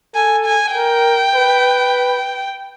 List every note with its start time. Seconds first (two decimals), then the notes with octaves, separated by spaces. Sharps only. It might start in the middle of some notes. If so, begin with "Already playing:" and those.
0.15 A4 G#5
0.45 G#5
0.74 A#4 G5
1.35 B4